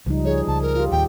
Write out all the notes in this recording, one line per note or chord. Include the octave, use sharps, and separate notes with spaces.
C#2 F3 G3 D#4
F3 G#4 C#5
C#2 A5
A#4
F4 G4
D1 D#2 G5